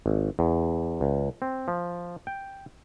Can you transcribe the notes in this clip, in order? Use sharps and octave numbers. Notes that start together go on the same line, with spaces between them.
G#1
E2
C#2
C4
F3
G5